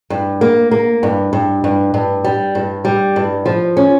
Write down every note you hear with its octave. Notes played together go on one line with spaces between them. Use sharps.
G2
A#3
A#3
G2
G2
G2
G2
G3
G2
G3
G2
F3
C#4